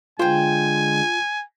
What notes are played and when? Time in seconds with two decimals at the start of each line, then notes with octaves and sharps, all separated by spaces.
0.19 D3 G#3 F4 C5 G5 G#5